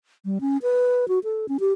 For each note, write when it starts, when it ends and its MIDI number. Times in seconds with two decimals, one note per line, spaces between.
0.25 0.38 55
0.41 0.58 61
0.62 1.08 71
1.08 1.19 66
1.24 1.46 69
1.49 1.57 61
1.60 1.73 67